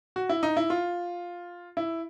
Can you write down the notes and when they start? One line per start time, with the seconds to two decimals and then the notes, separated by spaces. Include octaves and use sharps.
0.16 F#4
0.29 E4
0.43 D#4
0.57 E4
0.70 F4
1.77 E4